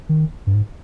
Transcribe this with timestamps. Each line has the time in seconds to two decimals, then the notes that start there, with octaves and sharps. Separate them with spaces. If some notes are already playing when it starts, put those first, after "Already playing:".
0.09 D#3
0.47 G2
0.54 G#2